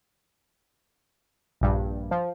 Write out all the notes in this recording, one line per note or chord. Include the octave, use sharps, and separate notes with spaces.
A#1 G2
F3